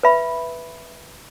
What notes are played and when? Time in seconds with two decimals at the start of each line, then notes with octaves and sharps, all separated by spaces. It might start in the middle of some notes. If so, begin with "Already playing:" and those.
0.03 B4 E5 B5